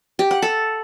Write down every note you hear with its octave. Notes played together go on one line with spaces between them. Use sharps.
G4
F#5
A4